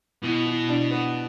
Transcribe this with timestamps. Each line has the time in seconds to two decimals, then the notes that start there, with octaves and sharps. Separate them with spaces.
0.23 B2 E3
0.46 E3
0.69 D4
0.91 B3